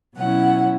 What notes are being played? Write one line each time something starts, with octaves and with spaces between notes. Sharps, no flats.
B2 F#3 C#4 E4 F#5